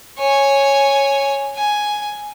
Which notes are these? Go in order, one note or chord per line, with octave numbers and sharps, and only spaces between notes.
C#5 G#5
G#5